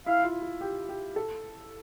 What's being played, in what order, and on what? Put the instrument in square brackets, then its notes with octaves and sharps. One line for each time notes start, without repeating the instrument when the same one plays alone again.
[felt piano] E4 [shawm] F5
[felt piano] F4
F4
G4
G4
A4